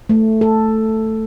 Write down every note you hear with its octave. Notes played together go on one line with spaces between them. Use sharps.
A3
A4